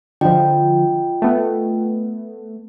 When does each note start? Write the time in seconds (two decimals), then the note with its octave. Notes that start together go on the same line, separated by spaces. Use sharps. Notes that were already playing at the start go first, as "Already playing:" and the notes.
0.21 D3 F3 F4 D#5 G5
1.22 A3 B3